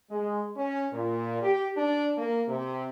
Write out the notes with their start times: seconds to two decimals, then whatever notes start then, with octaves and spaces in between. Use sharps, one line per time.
0.10 G#3
0.57 C#4
0.92 A#2
1.42 G4
1.77 D4
2.18 A#3
2.48 C3